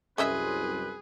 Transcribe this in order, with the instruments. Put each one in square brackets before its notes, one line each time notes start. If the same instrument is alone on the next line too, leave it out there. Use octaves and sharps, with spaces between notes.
[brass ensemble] C2 F#2 C4 [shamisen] C#4 D#5 E5 [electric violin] G#4 [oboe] B4